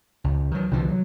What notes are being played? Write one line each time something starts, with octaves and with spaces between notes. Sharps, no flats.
C#2
D#3 F#3
C2 D3 E3 F3
F#3